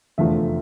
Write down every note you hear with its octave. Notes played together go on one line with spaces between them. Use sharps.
F1 E2 D3 F3 A3 E5